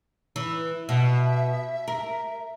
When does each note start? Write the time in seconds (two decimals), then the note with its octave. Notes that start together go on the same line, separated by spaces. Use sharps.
0.36 E3
0.89 B2 E5
1.88 A#4